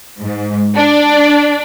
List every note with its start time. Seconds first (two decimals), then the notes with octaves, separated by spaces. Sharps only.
0.21 G#2
0.76 D4